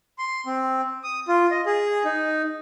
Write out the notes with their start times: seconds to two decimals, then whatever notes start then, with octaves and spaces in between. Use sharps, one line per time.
0.18 C6
0.46 C4
1.04 D#6
1.28 F4
1.51 D#5
1.66 G#4
2.05 D#4